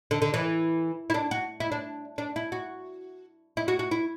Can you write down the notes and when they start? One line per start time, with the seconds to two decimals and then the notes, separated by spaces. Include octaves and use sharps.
0.11 D3
0.22 D3
0.34 E3
1.10 E4
1.14 D4
1.31 F#4
1.60 E4
1.72 D4
2.18 D4
2.36 E4
2.52 F#4
3.57 E4
3.68 F#4
3.79 F#4
3.91 E4